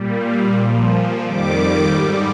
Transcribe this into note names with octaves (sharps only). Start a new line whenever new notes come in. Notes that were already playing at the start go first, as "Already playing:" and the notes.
Already playing: A#2 G3
F5
A#2 F3
F2 D#3 G3 D6
G#2 G3